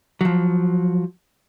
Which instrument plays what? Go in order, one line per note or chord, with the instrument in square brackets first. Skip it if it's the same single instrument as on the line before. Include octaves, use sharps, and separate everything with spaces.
[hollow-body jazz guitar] F3 F#3